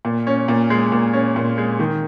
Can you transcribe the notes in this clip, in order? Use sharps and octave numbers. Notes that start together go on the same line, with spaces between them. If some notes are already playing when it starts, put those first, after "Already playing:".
A#2
C#4
A#2
G#3
A#2
C#4
A#2
G#3
D#3